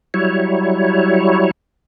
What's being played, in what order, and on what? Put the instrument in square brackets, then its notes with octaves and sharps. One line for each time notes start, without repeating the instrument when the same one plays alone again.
[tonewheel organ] F#3 G3 E4 C#5